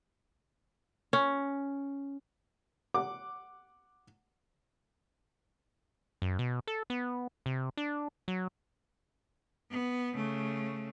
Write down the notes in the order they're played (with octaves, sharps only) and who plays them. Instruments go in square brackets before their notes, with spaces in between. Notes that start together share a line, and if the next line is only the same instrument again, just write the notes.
[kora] C#4
[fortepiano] F#5 D6
[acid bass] F#2
B2
A4
B3
C3
D4
F#3
[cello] B3
C#3 A3